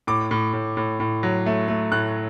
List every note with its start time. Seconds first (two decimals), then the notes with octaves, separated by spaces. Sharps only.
0.07 A2 D6
0.31 A2
0.53 A2
0.77 A2
1.00 A2
1.23 F#3
1.46 A3
1.68 A3
1.92 A2 F#6